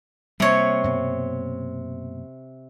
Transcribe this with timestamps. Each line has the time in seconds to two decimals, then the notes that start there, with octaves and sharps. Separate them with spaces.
0.40 C3 G3 A#3 C#5
0.84 F#2 B2 A#3